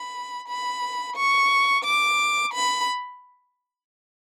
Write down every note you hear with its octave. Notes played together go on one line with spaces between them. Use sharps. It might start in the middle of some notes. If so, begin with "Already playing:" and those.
Already playing: B5
B5
C#6
D6
B5